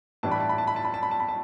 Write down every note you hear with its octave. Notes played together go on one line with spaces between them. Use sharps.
A2 E3 G3 D4 A5
B5
A5
B5
A5
B5
A5
B5
A5
B5
A5
B5
A5